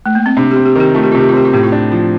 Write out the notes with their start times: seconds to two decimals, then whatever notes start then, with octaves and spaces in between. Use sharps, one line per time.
0.06 A3
0.15 A#3
0.26 C4
0.37 C3 D4
0.51 C4 G4
0.65 G4
0.76 D#3 G4
0.94 A3 F4
1.03 G4
1.12 C3 F4
1.20 G4
1.29 F4
1.34 C4 G4
1.45 F4
1.53 A2 G4
1.63 F4
1.72 D4
1.92 F3